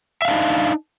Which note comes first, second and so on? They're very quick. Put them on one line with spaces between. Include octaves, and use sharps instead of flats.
E5 F5 D4 D#4